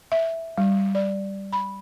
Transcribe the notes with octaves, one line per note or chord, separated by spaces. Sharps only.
E5
G3
D5
B5